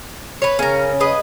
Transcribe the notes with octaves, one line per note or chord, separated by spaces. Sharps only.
B4 C#5
C#3 C#4 A#4
G#4 B4 D#5